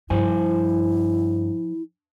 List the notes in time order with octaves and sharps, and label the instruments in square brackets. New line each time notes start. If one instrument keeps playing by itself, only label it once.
[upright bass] G2 [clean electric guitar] F3 C5 G#5 [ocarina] E4